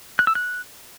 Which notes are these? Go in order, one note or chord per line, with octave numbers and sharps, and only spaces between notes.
F#6
E6
F#6